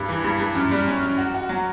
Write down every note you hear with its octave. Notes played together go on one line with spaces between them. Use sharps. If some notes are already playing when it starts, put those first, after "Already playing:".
Already playing: G2
E3
G2
G2
F#2
G3
C#4
F#2
F#4
F#4
F#3